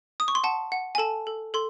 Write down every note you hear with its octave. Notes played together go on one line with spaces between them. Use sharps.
D#6
C#6
C6
F#5 A5
F#5
G#5
A4 A5
A4
A4 C6